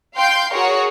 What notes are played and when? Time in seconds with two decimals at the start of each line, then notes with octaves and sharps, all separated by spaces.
0.15 F5 G5 C6 G6
0.52 F#4 G#4 A#4 C#5